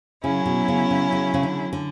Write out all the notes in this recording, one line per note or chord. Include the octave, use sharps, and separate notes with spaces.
C#3 F#3 C#4 E4
B2
C#3
C#3
C#3
C#3
D3
D3